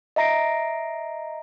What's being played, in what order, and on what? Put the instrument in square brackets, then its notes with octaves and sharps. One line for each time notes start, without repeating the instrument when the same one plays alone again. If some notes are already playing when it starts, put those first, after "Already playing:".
[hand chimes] D#5 E5 A#5 A#6 C7 D7